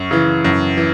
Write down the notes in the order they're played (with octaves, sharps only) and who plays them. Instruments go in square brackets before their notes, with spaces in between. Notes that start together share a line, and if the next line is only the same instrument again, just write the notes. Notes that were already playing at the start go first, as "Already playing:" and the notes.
Already playing: [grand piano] F#2 C#6
C#3 E3
F#2
E3